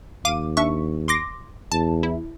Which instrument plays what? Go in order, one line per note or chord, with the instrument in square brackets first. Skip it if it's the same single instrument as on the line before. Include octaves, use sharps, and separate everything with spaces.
[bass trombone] D#2 [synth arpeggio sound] F5 D6 D#7
[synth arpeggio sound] D4 E5 C#6
C6 D6 A#6
[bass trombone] E2 [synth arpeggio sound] A5
[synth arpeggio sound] E4